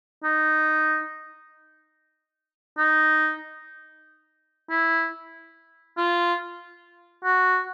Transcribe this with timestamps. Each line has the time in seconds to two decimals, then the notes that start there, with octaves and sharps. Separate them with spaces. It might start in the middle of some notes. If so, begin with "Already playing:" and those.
0.24 D#4
2.78 D#4
4.70 E4
5.97 F4
7.24 F#4